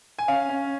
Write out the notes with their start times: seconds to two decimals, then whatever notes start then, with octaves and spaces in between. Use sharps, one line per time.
0.19 G#5
0.28 C#4 F5
0.49 C#4